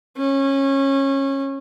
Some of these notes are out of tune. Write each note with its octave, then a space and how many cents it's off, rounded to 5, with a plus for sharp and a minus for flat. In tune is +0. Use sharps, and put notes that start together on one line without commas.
C#4 -20